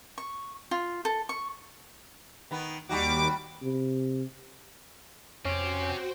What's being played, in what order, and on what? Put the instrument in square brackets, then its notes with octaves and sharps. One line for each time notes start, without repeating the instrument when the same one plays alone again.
[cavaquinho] C#6
F4
A4
C#6
[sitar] D#3 B3
[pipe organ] D#2 D6 [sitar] G3 D#4 F#4
[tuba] C3
[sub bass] F2 [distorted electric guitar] C4 G4 [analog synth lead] C#4 [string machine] F#4 C5 G5